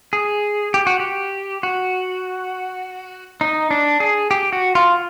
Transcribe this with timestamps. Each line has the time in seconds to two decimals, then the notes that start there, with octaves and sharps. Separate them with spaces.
0.13 G#4
0.74 G4
0.87 F#4
1.00 G4
1.63 F#4
3.41 D#4
3.71 D4
4.00 G#4
4.31 G4
4.53 F#4
4.75 F4